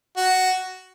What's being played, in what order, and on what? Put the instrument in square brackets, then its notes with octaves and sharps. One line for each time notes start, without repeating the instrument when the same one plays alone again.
[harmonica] F#4